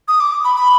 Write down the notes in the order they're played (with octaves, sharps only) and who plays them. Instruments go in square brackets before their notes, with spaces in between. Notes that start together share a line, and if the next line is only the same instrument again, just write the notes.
[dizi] D#6
D6
B5
B5